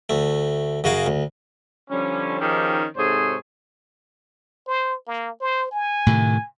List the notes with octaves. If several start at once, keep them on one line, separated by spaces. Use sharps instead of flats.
D2 A3
F#2 C#3 F#4 G#4 F5 A#5
D2
D3 F3 G3 C#4
D#3 F3 C#4 D#4 G4 G#4
G#2 C3 G#4 A4 C5 C#5
C5
A#3
C5
G#5
A2 C3 D#3